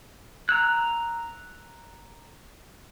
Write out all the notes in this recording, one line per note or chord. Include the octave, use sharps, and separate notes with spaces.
A#5 E6 F#6